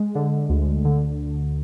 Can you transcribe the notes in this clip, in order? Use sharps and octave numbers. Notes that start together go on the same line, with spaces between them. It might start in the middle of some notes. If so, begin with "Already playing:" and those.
Already playing: G#3
D3
D2
D3